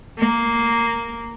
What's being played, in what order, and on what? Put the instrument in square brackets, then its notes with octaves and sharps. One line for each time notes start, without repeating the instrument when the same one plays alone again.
[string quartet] A#3